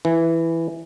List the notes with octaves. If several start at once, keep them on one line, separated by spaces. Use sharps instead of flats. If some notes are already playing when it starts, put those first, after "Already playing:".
E3